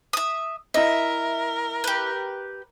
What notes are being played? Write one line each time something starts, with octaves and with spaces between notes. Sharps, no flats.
E5 D#6
E4 A#4 D#5 E5
G4 B4